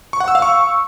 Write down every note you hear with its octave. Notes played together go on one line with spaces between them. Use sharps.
C#6
F#5
E6
F5
C#6